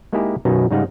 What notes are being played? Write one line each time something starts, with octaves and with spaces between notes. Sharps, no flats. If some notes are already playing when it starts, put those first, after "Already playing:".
G#3 A#3 D#4 E4 G4 G#4
B1 F#2 B2 D#3 C#4 D#4
G#2 C#3 G3 D#4 F5 F#5